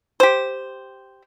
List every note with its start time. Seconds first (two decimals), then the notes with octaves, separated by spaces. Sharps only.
0.20 G4 C5